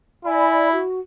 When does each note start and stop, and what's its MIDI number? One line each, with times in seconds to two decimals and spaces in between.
0.25 0.81 64
0.25 0.68 74
0.25 0.68 80
0.25 0.68 83
0.72 1.00 66